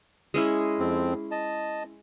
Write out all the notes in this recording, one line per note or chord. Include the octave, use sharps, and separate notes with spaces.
G#3 C#4 E4
F2 C4
D#5 A5